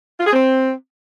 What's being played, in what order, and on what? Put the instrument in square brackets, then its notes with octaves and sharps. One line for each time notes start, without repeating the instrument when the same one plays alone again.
[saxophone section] F4
G#4
C4